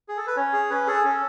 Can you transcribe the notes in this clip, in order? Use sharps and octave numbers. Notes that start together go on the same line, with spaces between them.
G#4
A4
B4
C#4 C#5
G#4
C#4 B4
G#4 A4
C#4 A4